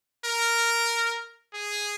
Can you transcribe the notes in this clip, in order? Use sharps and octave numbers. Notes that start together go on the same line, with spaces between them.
A#4
G#4